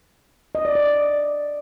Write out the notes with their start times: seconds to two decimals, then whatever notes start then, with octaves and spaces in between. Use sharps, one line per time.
0.55 D#5
0.65 D5
0.75 D5